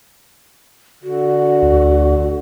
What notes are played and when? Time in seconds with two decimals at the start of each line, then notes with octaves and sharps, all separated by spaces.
1.03 D3 F#4
1.62 D2